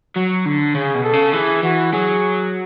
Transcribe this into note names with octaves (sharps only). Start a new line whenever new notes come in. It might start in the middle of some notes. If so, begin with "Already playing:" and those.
F#3
D3
C#3 G#4
B2
A4
C#3
E3 G#4
E3 F#4
F#3 G#4